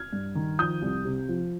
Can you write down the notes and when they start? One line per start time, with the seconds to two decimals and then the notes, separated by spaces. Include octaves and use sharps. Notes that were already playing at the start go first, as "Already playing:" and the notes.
Already playing: F6 G#6
0.13 G2
0.35 D#3
0.59 F3 D#6 G6
0.82 C2
1.05 C3
1.29 F3